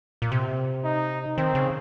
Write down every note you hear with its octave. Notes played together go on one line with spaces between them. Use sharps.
A#2
C3
D#4
D#3 C4
C#3